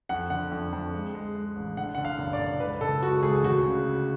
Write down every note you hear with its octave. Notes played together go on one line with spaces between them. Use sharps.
F2 F#5
D3 F#5
F2
F2
G#3
G#3
G#3
A1
D3 F#5
D3 F#5
F5
F#1
D5
F#1
C#2 B4
C#2 A4
G#3 F#4
C#2 G#4
D2 F#4
C#3
C#3